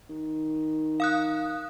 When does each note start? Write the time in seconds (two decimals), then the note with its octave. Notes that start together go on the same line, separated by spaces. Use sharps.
0.10 D#3
1.00 F5 D#6 F#6